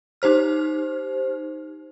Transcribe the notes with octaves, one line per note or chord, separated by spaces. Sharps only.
D#4 G4 C5 F6